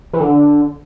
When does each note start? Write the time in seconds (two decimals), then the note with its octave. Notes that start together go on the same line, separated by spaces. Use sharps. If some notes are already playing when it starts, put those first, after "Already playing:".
0.13 E3
0.20 D3